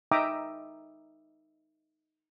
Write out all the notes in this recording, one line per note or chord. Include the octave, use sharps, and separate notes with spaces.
D#4 E5 G5 A#5 D6 D#6